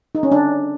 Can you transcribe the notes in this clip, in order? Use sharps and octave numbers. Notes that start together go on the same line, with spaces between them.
D#4
C#4
D4